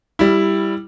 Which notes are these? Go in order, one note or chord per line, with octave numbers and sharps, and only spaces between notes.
G3 E4